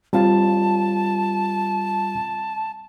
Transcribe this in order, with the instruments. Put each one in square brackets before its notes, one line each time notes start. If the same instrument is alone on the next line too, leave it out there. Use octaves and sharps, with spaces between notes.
[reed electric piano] G3 C4 F4 [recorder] A5